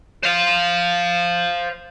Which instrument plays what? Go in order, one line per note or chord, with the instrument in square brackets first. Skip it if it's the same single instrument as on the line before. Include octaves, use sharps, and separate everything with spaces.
[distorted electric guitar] C5 F5